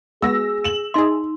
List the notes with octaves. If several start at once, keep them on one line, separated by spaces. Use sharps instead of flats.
G#3 B3 F#4 G#4 E6 A#6
E7 F#7
D#4 G#4 D#5 E5 C6